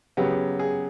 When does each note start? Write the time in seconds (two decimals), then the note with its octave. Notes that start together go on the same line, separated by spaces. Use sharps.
0.17 C#3 F#3 B3 G4
0.59 G#4